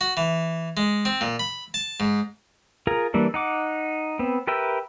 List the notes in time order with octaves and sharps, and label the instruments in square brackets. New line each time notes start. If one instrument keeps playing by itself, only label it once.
[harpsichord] F#4
E3
G#3
C4
A#2
B5
A5
G#2
[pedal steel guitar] F4 G#4 A#4 A#5
E3 G3 A#3 D4
D#4 F#5 D6
B3 C4
G4 A#4 B4 E5 G5